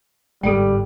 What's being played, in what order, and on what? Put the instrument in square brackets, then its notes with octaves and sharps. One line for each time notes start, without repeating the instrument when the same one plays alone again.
[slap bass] G1 G#2 G#3 [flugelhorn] G3 [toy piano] A4 G5